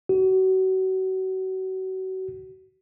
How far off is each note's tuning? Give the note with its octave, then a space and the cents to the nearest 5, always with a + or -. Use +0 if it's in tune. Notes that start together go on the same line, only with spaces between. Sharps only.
F#4 +30